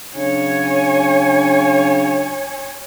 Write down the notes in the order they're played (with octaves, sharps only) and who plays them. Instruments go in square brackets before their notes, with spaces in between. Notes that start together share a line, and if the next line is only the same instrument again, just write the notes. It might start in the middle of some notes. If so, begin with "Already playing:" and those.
[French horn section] C#3 F#3 D4 [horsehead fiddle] C#5 G#5